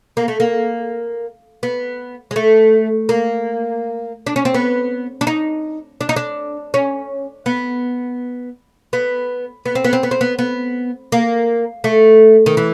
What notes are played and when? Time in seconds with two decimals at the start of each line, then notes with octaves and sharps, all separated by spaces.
0.17 A#3
0.28 A3
0.40 A#3
1.63 B3
2.31 G#3
2.36 A3
3.09 A#3
4.26 D4
4.36 C#4
4.45 C4
4.54 B3
5.21 D4
5.27 D#4
6.01 D4
6.09 D#4
6.16 D4
6.74 C#4
7.46 B3
8.93 B3
9.66 B3
9.75 C4
9.84 B3
9.93 C4
10.03 B3
10.11 C4
10.21 B3
10.39 B3
11.12 A#3
11.84 A3
12.46 D#3
12.57 E3